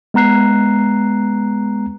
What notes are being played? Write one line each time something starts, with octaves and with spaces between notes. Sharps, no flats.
G#3 B3 A#5 F#6 C7